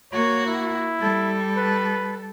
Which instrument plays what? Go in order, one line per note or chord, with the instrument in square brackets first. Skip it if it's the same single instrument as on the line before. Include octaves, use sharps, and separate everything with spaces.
[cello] A#3 F#4 [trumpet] C#5
[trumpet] E4
[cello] G3 A4
[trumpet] B4